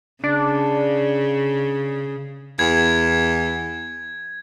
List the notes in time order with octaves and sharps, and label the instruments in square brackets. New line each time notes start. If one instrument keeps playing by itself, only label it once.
[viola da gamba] C#3 [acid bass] D4
[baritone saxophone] E2 [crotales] G#6